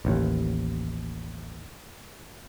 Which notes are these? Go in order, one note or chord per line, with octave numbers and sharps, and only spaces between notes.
A1 D#2